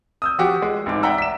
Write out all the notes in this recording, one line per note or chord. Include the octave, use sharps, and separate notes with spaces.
D#6 E6 G6
F3 F#4 G4
G#3
A1 G#2 D6
D5 E5 F#5 G5 A#5 E6
B6 E7